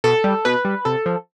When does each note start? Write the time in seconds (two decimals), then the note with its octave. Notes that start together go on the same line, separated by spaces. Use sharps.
0.04 B2 A4
0.24 G3
0.45 B2 B4
0.65 G3
0.85 C3 A4
1.06 F3